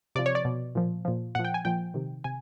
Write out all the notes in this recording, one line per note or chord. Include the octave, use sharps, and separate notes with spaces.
C3 F3 D5
C#5
D5
B2
A#2 F3
A#2 F3
A#2 F3 F#5
G5
G#5
A#2 F3 G5
C3 D#3
C3 G#5